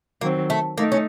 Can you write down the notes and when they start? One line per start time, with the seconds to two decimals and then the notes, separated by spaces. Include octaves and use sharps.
0.21 D#3 F#3 A#3 C4
0.50 A3
0.77 A3 A#3 D#4
0.92 C#4